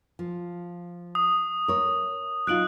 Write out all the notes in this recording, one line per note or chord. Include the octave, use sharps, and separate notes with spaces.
F3
D#6
A#4 C#5
F#3 D#4 F4 F#6 D7 F#7